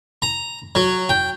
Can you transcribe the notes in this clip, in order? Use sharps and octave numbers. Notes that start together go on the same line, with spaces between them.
A#5
F#3
G5